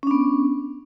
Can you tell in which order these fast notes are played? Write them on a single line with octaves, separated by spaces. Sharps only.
C#4 D4 B3